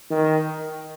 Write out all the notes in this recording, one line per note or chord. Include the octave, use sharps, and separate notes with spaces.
D#3